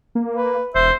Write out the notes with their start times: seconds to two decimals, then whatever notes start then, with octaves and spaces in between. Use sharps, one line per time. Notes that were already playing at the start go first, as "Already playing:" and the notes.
0.15 A#3
0.36 B4
0.75 E1 C5 E5